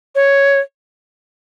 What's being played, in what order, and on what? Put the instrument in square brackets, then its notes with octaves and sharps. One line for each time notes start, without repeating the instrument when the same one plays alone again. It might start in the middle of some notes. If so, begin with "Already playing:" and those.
[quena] C#5